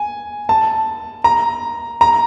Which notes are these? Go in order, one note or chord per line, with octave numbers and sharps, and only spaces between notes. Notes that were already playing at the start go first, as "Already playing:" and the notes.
Already playing: G#5
A5
A#5
A#5